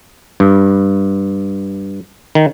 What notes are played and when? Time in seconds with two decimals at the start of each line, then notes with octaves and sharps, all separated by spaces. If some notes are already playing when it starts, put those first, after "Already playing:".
0.40 G2
2.35 D#3